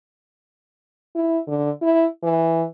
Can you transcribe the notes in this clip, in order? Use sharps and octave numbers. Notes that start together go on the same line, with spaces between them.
E4
D3
E4
E3